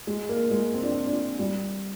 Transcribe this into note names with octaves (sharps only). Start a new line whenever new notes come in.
G#3
A#3
G#3
C4
D4
C4
D4
G3